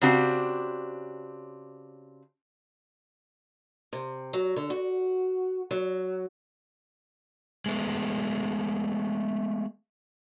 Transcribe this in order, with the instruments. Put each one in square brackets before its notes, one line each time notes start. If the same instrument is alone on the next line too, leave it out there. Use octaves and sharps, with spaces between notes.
[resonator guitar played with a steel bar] C#3 C4 D4 F#4 G4
[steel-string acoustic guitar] C3
F#3
D3
F#4
F#3
[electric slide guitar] G#3 A3 B3